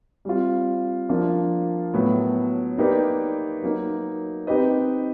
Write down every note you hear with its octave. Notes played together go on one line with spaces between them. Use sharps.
G3 C4 F4
F3 A#3 D4 F4
A2 F#3 B3
A#3 D#4 G4 B4 D5
F#3 A#3 D#4
C4 D#4 G4 B4 D#5